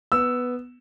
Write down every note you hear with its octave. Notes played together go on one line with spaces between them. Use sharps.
B3 E6